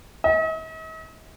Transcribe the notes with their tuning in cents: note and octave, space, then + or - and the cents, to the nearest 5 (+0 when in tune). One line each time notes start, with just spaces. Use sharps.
D#5 +45